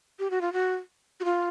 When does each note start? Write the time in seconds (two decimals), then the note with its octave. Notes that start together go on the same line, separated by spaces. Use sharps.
0.19 G4
0.30 F#4
0.41 F4
0.53 F#4
1.20 F#4
1.25 F4